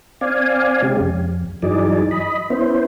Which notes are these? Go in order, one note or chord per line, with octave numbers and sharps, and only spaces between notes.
C4 D5 F5 G#5
C3 G#3 C#4 G4
F2
G2 E3 F#3 D#4 G#4 D5
D#5 B5
B3 C#4 E4 C5